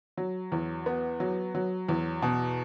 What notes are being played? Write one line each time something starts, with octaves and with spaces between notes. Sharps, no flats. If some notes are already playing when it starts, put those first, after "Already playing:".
F#3
E2
B3
F#3
F#3
E2
B2